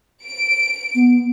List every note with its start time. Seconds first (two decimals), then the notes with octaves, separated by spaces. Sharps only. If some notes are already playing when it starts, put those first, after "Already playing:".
0.25 D7
0.95 B3